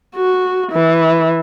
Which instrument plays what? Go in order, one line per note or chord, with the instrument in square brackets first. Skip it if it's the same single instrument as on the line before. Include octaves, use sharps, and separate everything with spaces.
[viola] F#4
E3